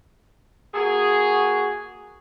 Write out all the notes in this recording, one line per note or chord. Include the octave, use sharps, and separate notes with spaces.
A#3 F#4 G#4